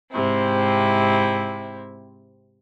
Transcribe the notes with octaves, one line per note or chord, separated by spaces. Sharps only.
G#2 C3 C4 E4